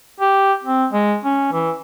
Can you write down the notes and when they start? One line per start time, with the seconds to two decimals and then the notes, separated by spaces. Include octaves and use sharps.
0.20 G4
0.63 C4
0.93 G#3
1.24 C#4
1.52 E3